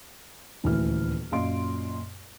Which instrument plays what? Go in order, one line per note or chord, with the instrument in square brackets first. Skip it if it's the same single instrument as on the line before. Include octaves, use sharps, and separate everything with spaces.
[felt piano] D#1 D2 E3 E4 B4 F6
F#2 A#2 D#5 F5 C6 D7